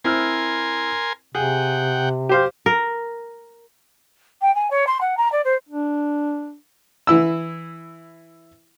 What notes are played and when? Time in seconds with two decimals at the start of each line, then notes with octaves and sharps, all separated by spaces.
0.04 C4 E4 A#4 G#5 C6 F6
1.35 C3 G#4 F#5 G5
2.29 G4 C5 F5
2.66 A#4
4.42 G5
4.55 G#5
4.71 C#5
4.87 C6
5.01 F#5
5.18 A#5
5.32 D5
5.45 C5
5.69 D4
7.07 E3 E4 E6